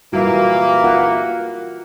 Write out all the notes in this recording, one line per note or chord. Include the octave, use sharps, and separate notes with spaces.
A#2 E3 G3 A#3 E4 F#4
F4 A#4 F#5